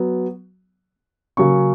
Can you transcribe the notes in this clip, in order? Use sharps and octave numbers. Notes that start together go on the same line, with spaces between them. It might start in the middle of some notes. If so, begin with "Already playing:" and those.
Already playing: F#3 B3
C#3 F#3 A#3 C#4 C#6